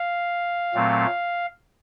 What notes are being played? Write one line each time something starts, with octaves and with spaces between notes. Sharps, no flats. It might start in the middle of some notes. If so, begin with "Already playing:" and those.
Already playing: F5
A#2 F#3 A3 C4